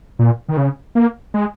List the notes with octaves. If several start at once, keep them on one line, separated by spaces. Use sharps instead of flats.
A#2
D#3
C#3
A#3
G#3